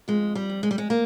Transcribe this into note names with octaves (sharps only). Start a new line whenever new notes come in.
F2 G#3
G3
F2
G#3
G3
G#3
A#3